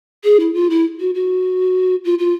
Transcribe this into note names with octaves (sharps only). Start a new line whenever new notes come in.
G#4
E4
F4
E4
F#4
F#4
F4
F4